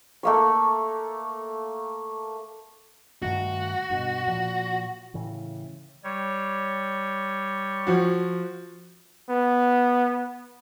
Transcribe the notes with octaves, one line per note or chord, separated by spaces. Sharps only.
A3 A#3 C#6
G2 D#3 A3 F#4
G2 B2
A#2 F3
A2 C#3 E3
G3 C#5
F3 F#4
B3